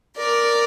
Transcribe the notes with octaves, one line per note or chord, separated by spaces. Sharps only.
A#4 D5